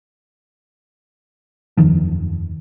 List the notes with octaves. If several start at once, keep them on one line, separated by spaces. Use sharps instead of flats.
F#1 E2 D#3 F3